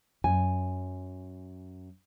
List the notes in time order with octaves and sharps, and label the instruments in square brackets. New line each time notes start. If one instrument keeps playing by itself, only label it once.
[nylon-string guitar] F#2 G#5